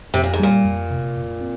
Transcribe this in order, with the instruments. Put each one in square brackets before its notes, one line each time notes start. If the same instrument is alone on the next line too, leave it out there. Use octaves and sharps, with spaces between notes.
[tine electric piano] F2 [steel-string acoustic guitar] C3
[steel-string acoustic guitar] A#2
G#2
[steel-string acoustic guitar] A#2 [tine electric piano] G3
[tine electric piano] F2
C3
F2
C4